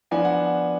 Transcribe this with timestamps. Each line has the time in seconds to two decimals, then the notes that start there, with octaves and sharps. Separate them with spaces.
0.11 F3 B3 D4 G#5
0.25 F#5